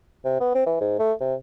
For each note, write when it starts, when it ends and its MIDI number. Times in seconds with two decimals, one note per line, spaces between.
0.25 0.36 48
0.40 0.54 59
0.55 0.62 60
0.66 0.77 52
0.81 0.96 44
0.99 1.13 57
1.20 1.34 48